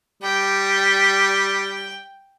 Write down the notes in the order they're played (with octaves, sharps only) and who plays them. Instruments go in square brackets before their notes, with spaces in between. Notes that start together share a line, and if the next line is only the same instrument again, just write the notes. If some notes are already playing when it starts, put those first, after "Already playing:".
[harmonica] G3 [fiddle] G5